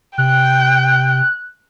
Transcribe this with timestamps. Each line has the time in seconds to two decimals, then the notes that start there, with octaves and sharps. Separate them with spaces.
0.18 C3 G5 F#6